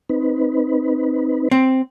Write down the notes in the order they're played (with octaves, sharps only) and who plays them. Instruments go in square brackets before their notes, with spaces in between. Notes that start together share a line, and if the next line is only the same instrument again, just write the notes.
[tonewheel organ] C4 D#4 B4
[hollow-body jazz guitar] C4